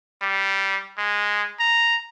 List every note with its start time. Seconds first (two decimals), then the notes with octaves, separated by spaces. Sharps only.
0.22 G3
0.98 G#3
1.60 A#5